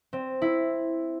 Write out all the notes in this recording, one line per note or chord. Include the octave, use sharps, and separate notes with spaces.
C4
E4